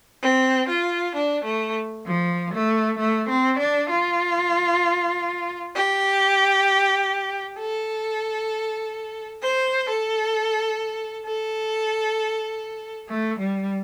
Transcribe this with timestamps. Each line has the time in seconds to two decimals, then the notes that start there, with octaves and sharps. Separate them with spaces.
0.23 C4
0.68 F4
1.14 D4
1.45 A3
2.06 F3
2.53 A3
2.99 A3
3.29 C4
3.59 D4
3.90 F4
5.74 G4
7.58 A4
9.42 C5
9.89 A4
11.26 A4
13.09 A3
13.40 G3